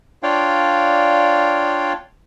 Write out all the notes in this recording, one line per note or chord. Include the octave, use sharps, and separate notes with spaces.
D4 F4 C#5 D5 F5 G5